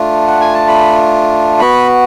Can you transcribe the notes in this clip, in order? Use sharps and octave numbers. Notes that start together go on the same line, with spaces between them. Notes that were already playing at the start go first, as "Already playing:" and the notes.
Already playing: A3 D4 F4
F#5
G#5
A5
B5
B3 F#4 B5